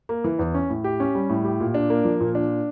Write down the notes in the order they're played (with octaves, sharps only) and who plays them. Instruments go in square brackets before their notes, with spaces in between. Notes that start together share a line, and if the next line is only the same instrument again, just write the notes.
[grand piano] A#3
E3
E2
C#4
A2
G4
C#4
G3
A2
G4
A#2
D4
A#3
F3
A#2
D4